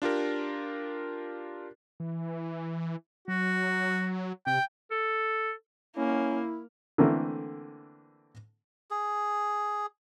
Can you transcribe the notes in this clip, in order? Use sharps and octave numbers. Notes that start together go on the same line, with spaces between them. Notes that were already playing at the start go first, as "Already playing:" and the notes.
D4 F4 G4 A#4
E3
F#3 F#4
C3 G5
A4
A#3 C#4 E4
D3 E3 A3 A#3 C4 A#4
G#4